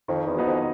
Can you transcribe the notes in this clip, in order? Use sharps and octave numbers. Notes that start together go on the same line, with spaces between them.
F2 D#3
E2
F#3 B3 D#4
F2